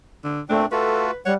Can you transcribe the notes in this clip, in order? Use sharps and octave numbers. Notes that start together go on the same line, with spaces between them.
D3
A#2 A3 C4 D4
A3 F4 F#4 A4 B4
G3 C#5 F#5